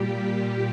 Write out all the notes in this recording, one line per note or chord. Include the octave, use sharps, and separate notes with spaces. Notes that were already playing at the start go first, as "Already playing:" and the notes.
Already playing: A#2 G3 G4